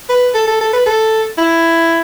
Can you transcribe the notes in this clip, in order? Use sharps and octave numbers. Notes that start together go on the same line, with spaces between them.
B4
A4
A4
A4
B4
A4
E4